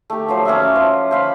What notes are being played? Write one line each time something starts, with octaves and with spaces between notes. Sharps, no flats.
A3 G4
F3 F#3 C5
C#4 A#4 D5 E5
F3 F4
C5 F5 B5